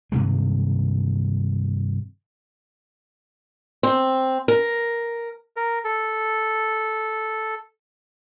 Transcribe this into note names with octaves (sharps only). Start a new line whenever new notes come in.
G2 C3 D#3 G#3
C4
A#4
A#4
A4